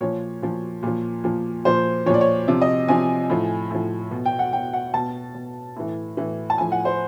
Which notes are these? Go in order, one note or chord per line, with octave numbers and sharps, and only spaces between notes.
A#2 F3 C#5
A#2 F3
A#2 F3
A#2 F3
A#2 F3 C5
A#2 F3 C#5 D5
C#5
C3 F3
D#5
C3 F3 G#5
A2 F3
A2 F3
B2
G5
F#5
B2 G5
F#5
B2 A5
B2
A2 E3
A2 E3
A5
A2 F3 G#5
F#5
C5